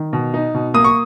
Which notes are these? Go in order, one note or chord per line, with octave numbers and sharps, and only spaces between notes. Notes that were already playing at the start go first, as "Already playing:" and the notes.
Already playing: D#3
B2
D#4
B2
A#3 D#6
C#6